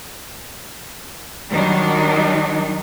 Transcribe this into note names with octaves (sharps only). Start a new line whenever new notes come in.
D#3 F#3 G3 D4 D#4